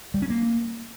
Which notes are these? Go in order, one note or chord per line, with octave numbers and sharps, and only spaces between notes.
G3
C#4
A#3